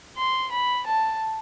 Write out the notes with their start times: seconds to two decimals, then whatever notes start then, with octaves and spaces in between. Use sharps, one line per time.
0.17 C6
0.51 B5
0.86 A5